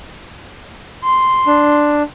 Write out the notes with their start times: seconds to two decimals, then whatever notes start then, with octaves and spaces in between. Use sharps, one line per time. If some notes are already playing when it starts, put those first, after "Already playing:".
1.04 C6
1.47 D4